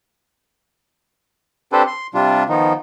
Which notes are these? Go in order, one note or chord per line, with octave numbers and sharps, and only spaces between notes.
C4 D4 G4 A4 B4 C5
C6
C3 G3 D4 F4
D#3 F3 B3 D#4